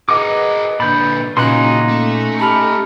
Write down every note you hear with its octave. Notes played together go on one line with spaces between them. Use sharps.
G#4 A#4 B4 D#5 F#5 D6
A#2 D3 B5 G6 A6
A#2 C#3 F#3 A#3 C#4 D#4 C6 F#6
A3
G4 A5 B5 F6